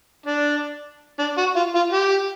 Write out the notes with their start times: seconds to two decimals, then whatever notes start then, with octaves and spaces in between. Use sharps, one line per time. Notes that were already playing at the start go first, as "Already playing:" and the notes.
0.26 D4
1.19 D4
1.38 F#4
1.56 F4
1.75 F4
1.93 G4